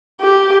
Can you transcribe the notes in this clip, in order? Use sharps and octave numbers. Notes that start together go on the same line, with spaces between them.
G4